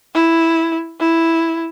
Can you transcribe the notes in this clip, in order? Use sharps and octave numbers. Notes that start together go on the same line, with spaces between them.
E4
E4